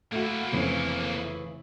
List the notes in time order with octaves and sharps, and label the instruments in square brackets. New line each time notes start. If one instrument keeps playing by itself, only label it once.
[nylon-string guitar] A3 F#4 [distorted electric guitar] A#3 E4
[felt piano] F1 C4 [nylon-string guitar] C#3 E3